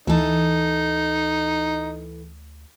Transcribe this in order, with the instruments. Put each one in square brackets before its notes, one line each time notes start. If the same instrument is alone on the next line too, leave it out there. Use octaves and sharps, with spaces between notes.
[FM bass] D2 [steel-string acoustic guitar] E3 A4 [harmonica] D#4